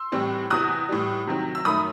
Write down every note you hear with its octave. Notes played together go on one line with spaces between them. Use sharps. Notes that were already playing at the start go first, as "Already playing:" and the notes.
Already playing: C6 E6
A2 E3 G3 C4
E2 C3 E3 D#6 F#6
A2 E3 G3
C3 D#3 F#3 C4
E6
F#2 D#3 A3 B5 D#6